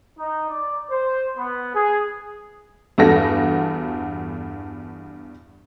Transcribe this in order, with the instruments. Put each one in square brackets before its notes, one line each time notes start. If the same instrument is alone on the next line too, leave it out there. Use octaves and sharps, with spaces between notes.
[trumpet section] D#4
D5
C5
B3
G#4
[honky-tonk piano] E2 G2 F#4 A4 A#6